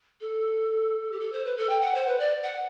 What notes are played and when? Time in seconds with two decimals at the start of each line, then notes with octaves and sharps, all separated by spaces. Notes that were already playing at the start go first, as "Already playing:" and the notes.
0.21 A4
1.12 G4
1.20 A4
1.32 C5
1.45 B4
1.57 A4
1.70 G5
1.81 F#5
1.95 C5
2.07 B4
2.19 D5
2.44 F#5